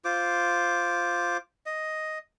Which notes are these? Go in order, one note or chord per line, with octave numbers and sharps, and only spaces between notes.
F4 C5 D6
D#5